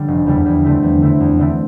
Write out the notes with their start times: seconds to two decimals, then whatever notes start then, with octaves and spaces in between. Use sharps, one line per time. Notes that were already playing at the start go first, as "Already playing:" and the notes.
Already playing: D3 G3
0.08 F1
0.26 E2 D3 G3
0.46 E2
0.64 D3 A3 C4 E4
0.83 E2
1.02 D3 A3 C4 E4
1.20 E2
1.39 D3 A3 C4 E4